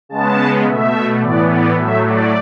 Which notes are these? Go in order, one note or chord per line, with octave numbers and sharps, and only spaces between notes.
C#3 G#3 B3 A5
B2 A3 E5
A2 E3 B3 D5
D5
A2 F#3 A3 E5
D5